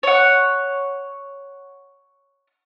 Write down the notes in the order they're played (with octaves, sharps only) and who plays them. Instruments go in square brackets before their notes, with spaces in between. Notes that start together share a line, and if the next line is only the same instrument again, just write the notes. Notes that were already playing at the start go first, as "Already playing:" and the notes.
[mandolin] C#5 F#5